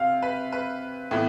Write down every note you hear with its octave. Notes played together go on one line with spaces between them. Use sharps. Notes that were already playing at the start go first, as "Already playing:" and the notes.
Already playing: C3 F5
B4
B4
A2 E3 B3